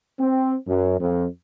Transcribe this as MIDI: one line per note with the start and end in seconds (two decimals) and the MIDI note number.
0.19 0.55 60
0.68 0.95 42
1.00 1.25 41